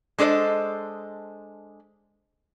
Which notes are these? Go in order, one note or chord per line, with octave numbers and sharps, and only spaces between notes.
G#3 D4 A4 C5 D#5